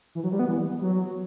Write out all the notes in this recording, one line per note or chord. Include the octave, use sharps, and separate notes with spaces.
E3
F#3
G3
B3
E3
F#3